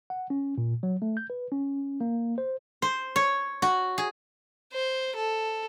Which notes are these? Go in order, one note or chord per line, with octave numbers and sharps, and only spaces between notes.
F#5
C#4
A#2
F#3
A3
G6
B4
C#4
A#3
C5
C5
C#5
F#4
G#4
C5
A4